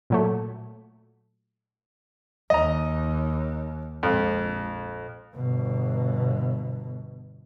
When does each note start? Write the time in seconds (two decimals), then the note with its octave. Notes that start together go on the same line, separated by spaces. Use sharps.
0.10 A#2 F#3 A3
2.50 D#2 D#5 A#5
4.03 A#1 F2 G#3
5.35 G1 B2